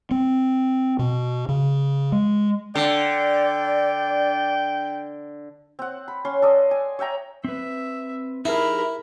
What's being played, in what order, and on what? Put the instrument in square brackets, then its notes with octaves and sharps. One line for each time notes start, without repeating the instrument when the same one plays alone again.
[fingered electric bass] C4
B2
C#3
G#3
[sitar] D3 [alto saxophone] D5 [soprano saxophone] G5
[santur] C4 F#5
B5
C#4 C6
A4 D5 D#5
G#5
C#5 E5 G5 A#5
[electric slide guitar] C4 B4 [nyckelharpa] E5
[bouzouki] F3 G#4 E5 [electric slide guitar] D#4 G4 [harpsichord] E4 [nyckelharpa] A#4 B5